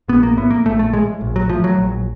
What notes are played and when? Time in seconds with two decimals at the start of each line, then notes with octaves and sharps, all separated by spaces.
0.08 A#1 B3
0.23 A#3
0.37 A2 B3
0.50 A#3
0.65 A#1 A3
0.79 A3
0.93 A2 G#3
1.21 A#1
1.36 F#3
1.49 A2 F3
1.64 F#3
1.77 A#1